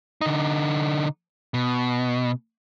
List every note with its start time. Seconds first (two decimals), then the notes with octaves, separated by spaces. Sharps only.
0.21 D3 D#4
1.54 B2